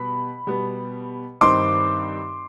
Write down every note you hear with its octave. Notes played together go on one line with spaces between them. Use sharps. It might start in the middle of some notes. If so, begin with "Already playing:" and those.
Already playing: B2 G3 B3 B5
B2 G3 B3
G2 D#3 G3 C4 D#4 C6 D6